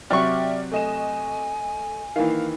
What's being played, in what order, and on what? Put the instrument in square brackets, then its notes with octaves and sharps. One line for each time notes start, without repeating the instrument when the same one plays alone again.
[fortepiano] C3 F#3 C#6 [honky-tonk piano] D5 G5 F6 [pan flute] E5
[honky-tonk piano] A3 D#5 E7 [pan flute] G#5
[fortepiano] D#3 E3 [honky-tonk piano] A#3 F5